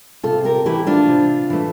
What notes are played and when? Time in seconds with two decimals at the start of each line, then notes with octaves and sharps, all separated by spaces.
0.24 C3 F4 A4
0.45 G4 A#4
0.66 E3 A3 E4 G4
0.87 D4 F4
1.08 C3
1.50 E3 A3